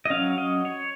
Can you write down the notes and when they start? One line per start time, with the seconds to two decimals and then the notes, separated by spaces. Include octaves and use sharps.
0.05 D#5
0.10 F#3 C#4 F5
0.38 D#5
0.65 C#5